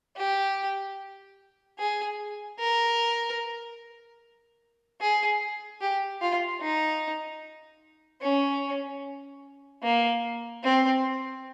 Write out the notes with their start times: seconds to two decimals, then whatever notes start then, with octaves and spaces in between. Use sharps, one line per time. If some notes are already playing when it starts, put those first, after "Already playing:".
0.17 G4
1.79 G#4
2.59 A#4
5.01 G#4
5.81 G4
6.21 F4
6.61 D#4
8.22 C#4
9.83 A#3
10.63 C4